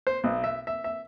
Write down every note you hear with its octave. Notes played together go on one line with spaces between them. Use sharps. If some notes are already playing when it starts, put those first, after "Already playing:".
C5
B1
E5
E5
E5